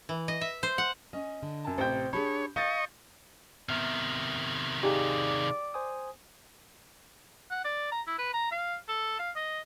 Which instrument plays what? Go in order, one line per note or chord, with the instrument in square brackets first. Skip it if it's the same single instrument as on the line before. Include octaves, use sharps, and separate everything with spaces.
[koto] E3
D#5
E5
C5
F#5
[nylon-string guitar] C#4 [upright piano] D#5
[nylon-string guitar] D3
[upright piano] F#2 A5
[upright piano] A1 C3 G6 [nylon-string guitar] C5 G5
[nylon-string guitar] D4 G4 G#4 [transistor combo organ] C#5 [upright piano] B5
[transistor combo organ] D#5 C#6 [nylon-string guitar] F5 [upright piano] G6 A6
[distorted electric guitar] C3 D#3 [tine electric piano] B3 E5 F6
[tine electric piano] D#4 G#4 F5 [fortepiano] G4 [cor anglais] D5
[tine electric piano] C5 G#5 D#6
[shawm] F#5
D5
A#5
E4
B4
A#5
F5
A4
F5
D#5